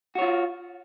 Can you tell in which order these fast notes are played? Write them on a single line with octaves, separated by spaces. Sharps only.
F#4 C#5 F4